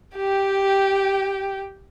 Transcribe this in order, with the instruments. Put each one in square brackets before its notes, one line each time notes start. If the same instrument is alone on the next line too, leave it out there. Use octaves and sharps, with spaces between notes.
[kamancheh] G4 G5